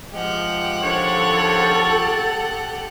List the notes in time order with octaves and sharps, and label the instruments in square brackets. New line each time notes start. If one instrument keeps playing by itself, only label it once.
[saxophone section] F3 G#3 [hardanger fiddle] G4 F#5
[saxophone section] D3 D#3 F3 [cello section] A4 [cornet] C#5